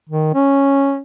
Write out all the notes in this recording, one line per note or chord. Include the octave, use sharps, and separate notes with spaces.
D#3
C#4